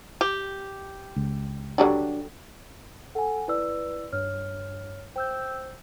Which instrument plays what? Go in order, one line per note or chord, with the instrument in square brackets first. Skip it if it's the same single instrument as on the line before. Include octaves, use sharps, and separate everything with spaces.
[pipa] G4
[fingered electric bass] C#2
[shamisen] D3 F#3 G3 [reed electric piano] D4 F#4
[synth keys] A4 [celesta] F#5 G#5
[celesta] E4 D5 E6 [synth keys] B4
[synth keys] G2 [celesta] C#5 F6
[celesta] C5 [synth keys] G5 E6 G6